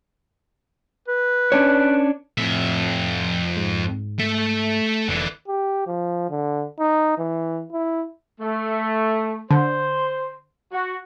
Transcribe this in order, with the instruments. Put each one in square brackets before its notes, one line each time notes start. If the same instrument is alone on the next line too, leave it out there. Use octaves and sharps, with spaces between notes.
[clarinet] B4
[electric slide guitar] C#4 D4 C#5
[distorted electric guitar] F2 E5 [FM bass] A2
[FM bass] G#2
[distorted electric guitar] A3 E5
[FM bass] F1 [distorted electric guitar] D3 E3
[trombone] G4
F3
D3
D#4
E3
E4
[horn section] A3
[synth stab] D3 [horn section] C5
[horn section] F#4